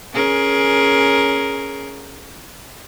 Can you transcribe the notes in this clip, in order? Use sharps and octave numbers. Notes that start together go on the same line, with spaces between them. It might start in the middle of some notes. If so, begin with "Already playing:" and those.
C#4 G#4 A#4